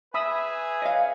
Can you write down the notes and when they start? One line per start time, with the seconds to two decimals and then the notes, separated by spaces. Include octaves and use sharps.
0.14 G#4 B4 E5 G#5 B5 D#6 E6
0.82 C#5 D#5 F5